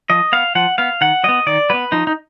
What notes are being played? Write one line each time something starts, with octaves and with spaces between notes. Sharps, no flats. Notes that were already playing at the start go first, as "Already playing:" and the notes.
F3 D#5
B3 F5
F3 F#5
B3 F5
D#3 F#5
F#3 B3 D#5
D#3 D5
F#3 B3 B4
F3 D#4
D#4